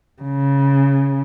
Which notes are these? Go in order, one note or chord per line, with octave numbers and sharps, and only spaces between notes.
C#3